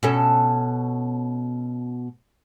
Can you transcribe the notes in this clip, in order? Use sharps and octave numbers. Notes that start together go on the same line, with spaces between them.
B2 C#4 A4